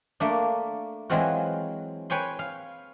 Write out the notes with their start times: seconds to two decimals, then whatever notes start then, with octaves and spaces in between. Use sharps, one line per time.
0.20 A3 A#3 D4
1.10 E3 F#3 G#3 C4 F4 F#4
2.10 B4 C#5 G5 G#5 C6
2.39 F5